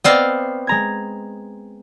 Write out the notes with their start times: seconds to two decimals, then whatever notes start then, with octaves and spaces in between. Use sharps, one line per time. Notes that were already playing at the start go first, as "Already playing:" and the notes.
0.04 B3 C4 D5 D#5 F5 D6
0.67 G#3 A#5 G#6